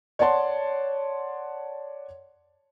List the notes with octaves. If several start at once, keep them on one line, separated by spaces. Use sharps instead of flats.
C#5 D5 F#5 A5 C6